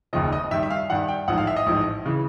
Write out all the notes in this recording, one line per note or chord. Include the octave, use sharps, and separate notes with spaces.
F1 D#2 C#3 F3 D#5
D#5
G2 D#3 G3 E5
E5
F5
G2 D#3 G3 F#5
G5
A1 G#2 F3 F#5
F5
E5
D#5
A1 G#2 F3
C#3 E3